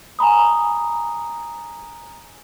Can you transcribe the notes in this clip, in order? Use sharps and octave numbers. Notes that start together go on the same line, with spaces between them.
G#5 A#5 B5 D#6